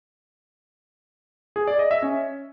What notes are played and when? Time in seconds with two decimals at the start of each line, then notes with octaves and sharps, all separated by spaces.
1.56 G#4
1.67 D5
1.79 D#5
1.91 E5
2.02 C#4